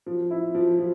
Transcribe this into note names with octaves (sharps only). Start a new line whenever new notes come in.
F3
E4
F3
F3